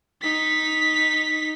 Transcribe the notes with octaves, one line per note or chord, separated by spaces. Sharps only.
D#4 B6